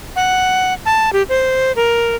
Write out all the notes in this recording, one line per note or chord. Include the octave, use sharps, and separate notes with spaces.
F#5
A5
G4
C5
A#4